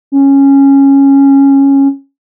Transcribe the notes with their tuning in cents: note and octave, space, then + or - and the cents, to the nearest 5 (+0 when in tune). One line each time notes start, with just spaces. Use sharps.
C#4 -10